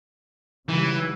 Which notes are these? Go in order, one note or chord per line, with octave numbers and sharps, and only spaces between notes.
C#3 E3 F#3 G3